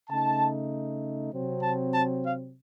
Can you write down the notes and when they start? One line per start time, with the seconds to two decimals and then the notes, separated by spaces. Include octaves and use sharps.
0.10 C#3 A3 D#4 A5
1.32 C3 F#3 C4
1.62 A5
1.94 A5
2.25 F5